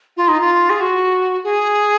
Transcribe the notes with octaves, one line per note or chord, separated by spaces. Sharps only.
F4
D#4
F4
G#4
F#4
G#4